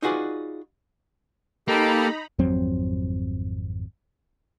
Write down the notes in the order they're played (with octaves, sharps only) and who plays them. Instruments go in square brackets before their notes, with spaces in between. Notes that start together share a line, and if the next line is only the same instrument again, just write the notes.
[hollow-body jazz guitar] D#4 F4 F#4 G#4 B4 D5
[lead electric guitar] A#3 [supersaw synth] D#4 A#5 B5 [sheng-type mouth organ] G4 A4
[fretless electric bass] G#1 F2 F#3 C4